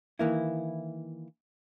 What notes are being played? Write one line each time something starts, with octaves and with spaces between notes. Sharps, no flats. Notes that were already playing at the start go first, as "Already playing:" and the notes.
D#3 E3 A#3 E4